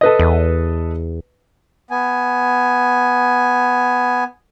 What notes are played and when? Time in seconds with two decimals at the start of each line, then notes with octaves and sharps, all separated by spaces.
0.01 A4 B4 D#5
0.19 E2
1.91 B3 G#5